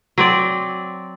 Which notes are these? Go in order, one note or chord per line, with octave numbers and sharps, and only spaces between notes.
F#3 C4 D5